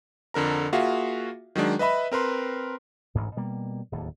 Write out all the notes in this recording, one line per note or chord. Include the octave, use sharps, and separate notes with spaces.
F2 D3 A#4 A#5
A#3 F4 F#4 G#4 E5 F5
D#3 F#3 G#3 D4
B4 D#5 E5 B5
C4 A#4 B4 C6
A1 D2 G#2
B2 G3 A#3
D1 D#2 D3